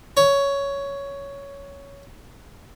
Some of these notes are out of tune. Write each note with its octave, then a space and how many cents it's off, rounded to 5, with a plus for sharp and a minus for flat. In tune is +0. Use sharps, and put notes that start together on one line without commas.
C#5 +10